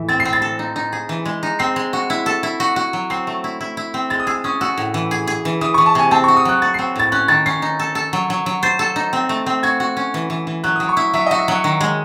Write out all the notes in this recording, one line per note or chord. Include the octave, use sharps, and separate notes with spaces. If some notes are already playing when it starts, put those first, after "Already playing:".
Already playing: A2 E3
C4 A6
C7
C4
A6
A4
D#4
D#4
G#4
E3
G#3
D#4
C4 C7
G#3
F#4
E4
A4
E4
F#4
F#4
F#3
C4 C7
A3
E4
E4
E4
C4
G#3 A6
D#6
G#4 E6
C#4 D#6
F#4 E6
A2
E3
G#4
G#4
E3
E3 D#6
E3 C#6
A5
C3 G#5
C4 A5
F#4 C#6
D#6
F#3 F#6
F#4 A6
C4 C7
A2 A6
C#4 F#6
D#3 A6
C#4 C7
D#4
A4
A4
F#3
F#3
F#3
C5 A6
A4
D#4
C4
A3
C4
F#4 G#6
F#4
C#4
E3
E3
E3
F#3 F#6
F#3 D#6
C#6
E4
F#3 E5
F#4 D#5
E5
F#3 F#5
D#3
G#3